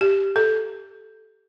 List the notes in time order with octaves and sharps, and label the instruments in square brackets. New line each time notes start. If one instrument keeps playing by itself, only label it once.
[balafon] G4
A4